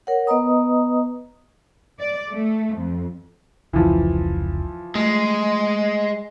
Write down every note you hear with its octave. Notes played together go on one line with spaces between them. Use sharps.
A#4 C#5 F#5
B3 B4 D#5 A#5 D#6
D5
A3
F2
F1 C#2 E3 F3
G#3 A3